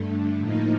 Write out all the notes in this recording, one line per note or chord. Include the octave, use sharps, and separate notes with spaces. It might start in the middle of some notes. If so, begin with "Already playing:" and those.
Already playing: G2 D3 A3
A2 F3 A#3 D#4